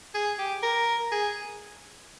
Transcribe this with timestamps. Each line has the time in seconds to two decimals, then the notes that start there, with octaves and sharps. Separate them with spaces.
0.14 G#4
0.39 G4
0.63 A#4
1.12 G#4